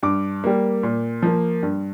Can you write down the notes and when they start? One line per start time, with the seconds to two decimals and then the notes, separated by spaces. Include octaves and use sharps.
0.03 G2 D6
0.44 G3 A#3
0.83 A#2
1.23 F3 A#3
1.63 G2